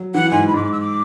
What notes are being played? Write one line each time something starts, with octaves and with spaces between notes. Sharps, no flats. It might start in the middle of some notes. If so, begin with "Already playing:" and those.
Already playing: F#3
E3 F#5
G#2 G#5
B5
G#2 D6
D6
E6
D6